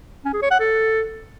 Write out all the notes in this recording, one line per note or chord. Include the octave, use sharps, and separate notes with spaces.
C#4
G#4
C#5
F#5
A4